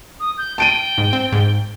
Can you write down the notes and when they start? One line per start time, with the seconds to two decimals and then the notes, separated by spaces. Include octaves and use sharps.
0.20 D#6
0.38 G6
0.58 G5 A5 D7 D#7
0.98 G#2
1.13 C4
1.32 G#2